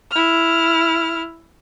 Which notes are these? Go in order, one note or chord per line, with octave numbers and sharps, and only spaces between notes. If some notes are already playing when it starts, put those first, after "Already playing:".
E4 F6